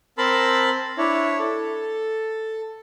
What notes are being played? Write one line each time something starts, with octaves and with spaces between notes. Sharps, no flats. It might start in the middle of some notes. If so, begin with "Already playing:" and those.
C4 A#4 A5 B5 C6 E6
D4 E4 C#5
A4